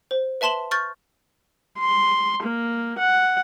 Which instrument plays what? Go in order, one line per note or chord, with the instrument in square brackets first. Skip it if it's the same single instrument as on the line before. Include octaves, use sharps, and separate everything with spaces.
[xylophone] C5
B4 E5 A5 C6 E7 F#7
C#6 F6 G6 A6
[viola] C6
A#3
F#5